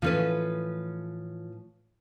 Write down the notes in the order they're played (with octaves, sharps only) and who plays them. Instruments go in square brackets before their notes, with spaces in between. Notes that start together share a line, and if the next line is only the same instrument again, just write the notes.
[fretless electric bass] A2 E3 A3 [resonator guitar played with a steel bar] F3 C#4 B4